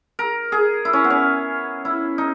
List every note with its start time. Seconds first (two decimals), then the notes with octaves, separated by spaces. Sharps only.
0.19 A#4
0.52 G#4
0.85 E4
0.93 C#4
1.04 B3
1.10 C#4
1.85 E4
2.18 D#4